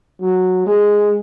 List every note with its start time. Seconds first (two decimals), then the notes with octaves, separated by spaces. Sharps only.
0.21 F#3
0.66 G#3